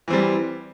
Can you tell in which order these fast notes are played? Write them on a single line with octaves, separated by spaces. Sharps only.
E3 C4 G3